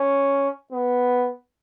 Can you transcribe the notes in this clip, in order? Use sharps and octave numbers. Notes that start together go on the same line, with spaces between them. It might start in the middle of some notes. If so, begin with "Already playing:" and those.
Already playing: C#4
B3